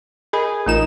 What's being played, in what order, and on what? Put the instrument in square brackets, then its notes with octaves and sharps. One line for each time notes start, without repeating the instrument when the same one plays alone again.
[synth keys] G#4 [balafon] A#4 D#5 B5
[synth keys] A1 D#4 E7 [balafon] A3 F4 A#4